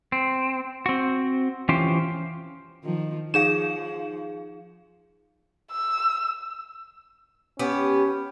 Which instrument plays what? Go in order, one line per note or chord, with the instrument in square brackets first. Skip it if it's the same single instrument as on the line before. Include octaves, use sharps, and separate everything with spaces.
[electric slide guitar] C4
C4 F#4
E3 C#4 F4 G4 C5
[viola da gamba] D#3 F3
[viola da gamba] F3 [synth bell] D#4 G#4 F5 [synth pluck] E7
[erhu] E6
[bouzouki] B3 G4 [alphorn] C#4